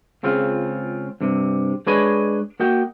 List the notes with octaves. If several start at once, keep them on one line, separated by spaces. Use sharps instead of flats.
C#2 C#3 C4 F4
G2 C3
G#3 D4 B4 C#5 D#5 G#5
A#3 F#4 D#5 G5